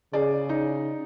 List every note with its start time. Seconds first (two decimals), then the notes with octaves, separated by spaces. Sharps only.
0.13 C#3 G#4 D5
0.49 D#4